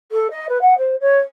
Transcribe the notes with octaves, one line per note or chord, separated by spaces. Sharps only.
A4
D#5
B4
F#5
C5
C#5